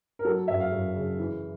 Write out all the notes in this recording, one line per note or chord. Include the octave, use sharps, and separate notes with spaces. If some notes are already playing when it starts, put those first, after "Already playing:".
A#4
F#3 A4
F#2 E5
F5
F#2
C#3
E3